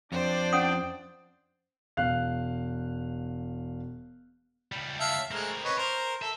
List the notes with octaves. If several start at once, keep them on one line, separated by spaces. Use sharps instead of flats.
F2 D4 C5 D5 G5
C#4 F#5 D#6
E1 F5 F#6 C7
C#2 G3
E5 F5 A5
G#3 A3 C4 A#4
B4 C#5 D#5
A#4 C5
A4 E5